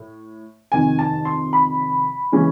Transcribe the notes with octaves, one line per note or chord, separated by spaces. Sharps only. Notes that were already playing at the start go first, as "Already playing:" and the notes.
Already playing: A2
F2 C3 D#3 G#5
A5
C6
B5
C#3 E3 G#3 C#4